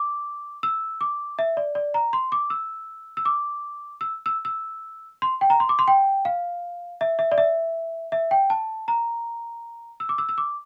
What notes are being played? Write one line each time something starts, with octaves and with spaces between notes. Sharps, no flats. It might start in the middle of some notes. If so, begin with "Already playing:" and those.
Already playing: D6
E6
D6
E5
D5
D5
A#5
C6
D6
E6
E6
D6
E6
E6
E6
C6
G5
A#5
C6
D6
C6
G5
F5
E5
E5
D5
E5
E5
G5
A5
A#5
E6
D6
E6
E6
D6